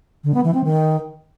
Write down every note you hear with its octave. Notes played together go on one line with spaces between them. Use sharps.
D3
B3
E3
C4
D#3